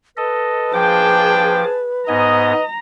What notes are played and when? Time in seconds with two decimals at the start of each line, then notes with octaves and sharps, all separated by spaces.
0.17 A4 B4 D#5
0.74 F3 A#3 D4 G#4 G5 A5 D6
2.08 G#2 B3 D#5 G#5 A#5